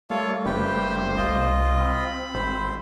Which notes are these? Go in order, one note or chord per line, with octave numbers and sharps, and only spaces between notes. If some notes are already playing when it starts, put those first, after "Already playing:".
G3 A3 A#3 F4 A4 C#5 F5
F#1 G4 B4 C5 G5
C2 F4 D#5
C4 B5
G#1 C5